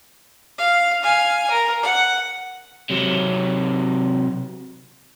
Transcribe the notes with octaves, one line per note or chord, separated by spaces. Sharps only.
F5
F5 G#5
A#4
F#5
C3 F#3